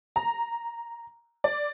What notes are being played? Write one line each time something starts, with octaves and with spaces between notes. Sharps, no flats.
A#5
D5